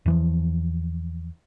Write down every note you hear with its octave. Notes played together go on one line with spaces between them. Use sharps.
E2 E3 F3